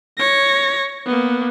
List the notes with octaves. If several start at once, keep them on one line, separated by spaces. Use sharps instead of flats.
C#5 A#6
A#3 B3